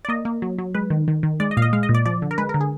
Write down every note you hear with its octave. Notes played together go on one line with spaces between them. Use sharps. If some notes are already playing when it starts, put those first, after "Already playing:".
D5
A#3 D#5
A#3
F#3
F#3
G#3 B4
D#3
D#3
D#3
G#3 D5
D#5
A#2 F5
D#5
G#3 F5
D#5
A#2
D5
F3 D5
D3
A#4
G#3 B4
A#4
D3
G#4